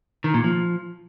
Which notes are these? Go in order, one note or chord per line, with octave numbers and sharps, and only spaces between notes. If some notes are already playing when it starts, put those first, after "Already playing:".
D#3
A#2
F3